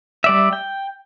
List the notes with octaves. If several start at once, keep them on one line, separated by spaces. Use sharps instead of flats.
G3 D5 E5
G5